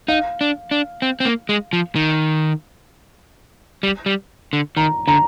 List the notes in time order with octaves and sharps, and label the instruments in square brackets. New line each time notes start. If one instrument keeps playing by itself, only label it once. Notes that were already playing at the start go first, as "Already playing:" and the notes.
[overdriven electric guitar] D#4 [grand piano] F5
[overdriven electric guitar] D4
D4
C4
C4
A#3
G#3
F3
D#3
G3
G3
D3
[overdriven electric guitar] D#3 [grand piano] A#5
[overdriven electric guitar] D3 [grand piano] A#5